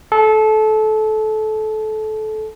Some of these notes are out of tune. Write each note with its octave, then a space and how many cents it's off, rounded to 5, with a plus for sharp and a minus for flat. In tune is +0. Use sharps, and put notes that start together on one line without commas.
A4 -25